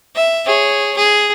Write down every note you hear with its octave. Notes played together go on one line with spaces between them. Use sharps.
E5
G#4 C#5
G#4